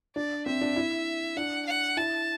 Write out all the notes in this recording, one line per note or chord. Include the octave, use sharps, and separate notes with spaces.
D4 D5
C4 E5
D4
E4
D4 F#5
F#5
E4 A5